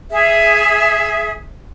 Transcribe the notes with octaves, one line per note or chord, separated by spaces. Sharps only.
G#4 E5